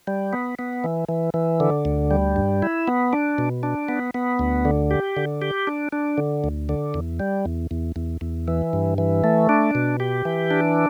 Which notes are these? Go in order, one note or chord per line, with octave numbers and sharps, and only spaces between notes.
G3
B3
B3
E3
E3
E3
D3
D2
G3
G2
E4
B3
D4
B2
D4
B3
B3
D2
D3
G4
D3
G4
D4
D4
D3
D2
D3
E2
G3
E2
E2
E2
E2
E3
G2
E3
A3
D4
B2
G4
E3
D4